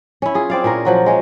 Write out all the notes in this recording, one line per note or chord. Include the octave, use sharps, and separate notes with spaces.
C#4 E4
F4 G#4
C4 D5 F5
A#2 C#4 E4 A#4
F3 F#3 F#4
G#3 C#4